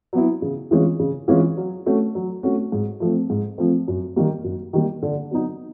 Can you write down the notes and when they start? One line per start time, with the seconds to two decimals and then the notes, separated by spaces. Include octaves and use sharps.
0.13 F#3 B3 E4
0.42 C#3
0.71 E3 G#3 C#4 F4
0.99 C#3
1.28 E3 G#3 C#4 F4
1.57 F#3
1.86 A3 C#4 F#4
2.15 F#3
2.43 A3 C#4 F#4
2.72 G#2
3.00 F3 A3 C4
3.30 G#2
3.58 F3 A3 C4
3.88 F#2
4.16 D#3 G3 A#3
4.44 F#2
4.73 D#3 G3 A#3
5.02 D3
5.31 F#3 B3 D#4